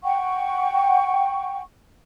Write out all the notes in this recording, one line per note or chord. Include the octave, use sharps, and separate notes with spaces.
F#5 G5 C#6